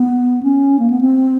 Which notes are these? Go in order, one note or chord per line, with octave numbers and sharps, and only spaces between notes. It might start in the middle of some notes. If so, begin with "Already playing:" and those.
Already playing: B3
C#4
A#3
B3
C4